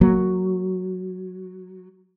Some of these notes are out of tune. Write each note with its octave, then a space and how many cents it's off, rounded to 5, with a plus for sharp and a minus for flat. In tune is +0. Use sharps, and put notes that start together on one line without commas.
F#3 +0 A#3 -15